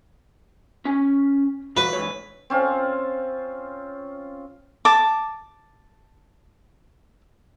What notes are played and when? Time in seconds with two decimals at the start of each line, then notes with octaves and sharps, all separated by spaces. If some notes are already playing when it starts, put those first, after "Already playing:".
0.85 C#4 G#5
1.77 E3 F#4 B4
1.93 G#2 E3 C#5
2.50 C4 C#4 F4
4.85 A5 D6